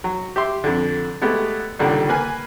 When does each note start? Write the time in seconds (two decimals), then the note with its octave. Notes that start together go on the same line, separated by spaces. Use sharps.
0.04 F#3
0.36 G4 E5 C6
0.64 F2 D3
1.21 G#3 A3 B3 G4
1.79 C#2 A#2 D3 D#3 G3
2.09 A#3 B4 G#5